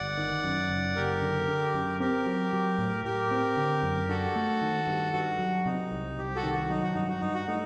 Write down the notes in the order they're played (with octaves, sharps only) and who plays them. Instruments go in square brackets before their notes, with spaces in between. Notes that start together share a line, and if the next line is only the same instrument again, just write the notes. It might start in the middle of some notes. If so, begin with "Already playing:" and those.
Already playing: [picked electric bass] G1 [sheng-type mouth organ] D5 F#5
[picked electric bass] D#3
F#2
F#1
[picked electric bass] F#1 [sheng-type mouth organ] G4 A#4
[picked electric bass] D3
D3
F#2
[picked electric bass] C4 [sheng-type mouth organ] G4 A#4
[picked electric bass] F#3
F#3
A2
[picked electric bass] A2 [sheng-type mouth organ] G4 A#4
[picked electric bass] C4
D3
F#2
[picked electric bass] D4 [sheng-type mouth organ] F#4 A4
[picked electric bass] A3
D#3
G2
[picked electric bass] G2 [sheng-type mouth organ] F#4
[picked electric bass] F#3
[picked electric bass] C3 [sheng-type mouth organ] D#4
[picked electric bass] C2
[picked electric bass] C2 [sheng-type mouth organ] G4
[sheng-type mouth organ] F#4 A4
[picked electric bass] D#3
[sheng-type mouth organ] F#4
[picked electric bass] F#3 [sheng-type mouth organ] D#4
[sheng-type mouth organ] F#4
[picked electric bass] G2 [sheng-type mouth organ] D#4
[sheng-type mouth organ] F#4
[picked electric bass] G2 [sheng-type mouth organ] D#4
[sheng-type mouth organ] F#4
[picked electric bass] A3 [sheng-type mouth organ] D#4